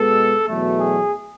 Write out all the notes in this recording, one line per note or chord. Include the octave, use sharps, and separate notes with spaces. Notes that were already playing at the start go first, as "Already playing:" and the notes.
Already playing: B2 G#3 B3 A4
E2 B2 F#3 A3
G#4